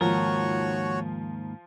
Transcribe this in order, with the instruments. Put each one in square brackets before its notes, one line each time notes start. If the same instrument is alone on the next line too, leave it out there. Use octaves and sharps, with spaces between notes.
[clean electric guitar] D#2 G#2 A#4 [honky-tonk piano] F3 [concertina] F#4 C#5